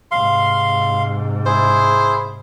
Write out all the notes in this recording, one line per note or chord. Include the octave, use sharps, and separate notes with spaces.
G#2 C3 F5 C6
E4 G#4 C5